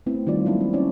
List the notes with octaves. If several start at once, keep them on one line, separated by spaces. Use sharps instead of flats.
A3 B3 C4 E4
D#3 G3 F4 D5
F#3 A#3 D4 E4
C4
C#4 D4 E4 C#5 D5